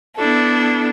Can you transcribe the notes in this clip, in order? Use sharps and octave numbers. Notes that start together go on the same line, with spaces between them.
B3 D4 E4 A4